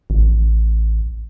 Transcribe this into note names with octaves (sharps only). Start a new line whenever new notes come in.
A1